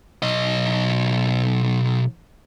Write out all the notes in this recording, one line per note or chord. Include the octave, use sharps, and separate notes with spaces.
B1 D#5